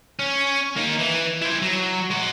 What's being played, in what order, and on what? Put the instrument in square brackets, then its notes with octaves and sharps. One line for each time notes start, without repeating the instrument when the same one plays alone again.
[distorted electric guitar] C#4
A#3 D#4
E3
E4 C5
F#3
G#3 F#5